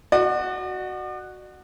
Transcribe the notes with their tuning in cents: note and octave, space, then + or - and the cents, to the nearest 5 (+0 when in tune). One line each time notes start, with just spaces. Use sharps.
F#4 +0 D5 +45